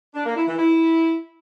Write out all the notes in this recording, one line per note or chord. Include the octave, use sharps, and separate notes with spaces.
D4
A#3
E4
E3
E4